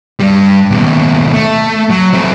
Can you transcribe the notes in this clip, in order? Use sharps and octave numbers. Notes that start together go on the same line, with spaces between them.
G2 G3
D#2 B2
A3
F#3
A3 C4